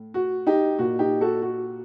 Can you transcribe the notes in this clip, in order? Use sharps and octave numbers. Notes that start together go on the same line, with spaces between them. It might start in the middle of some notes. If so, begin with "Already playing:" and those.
Already playing: A2
F#4
D#4 G4
A#2 F#4
D#4 G4
F#4 A4
F#4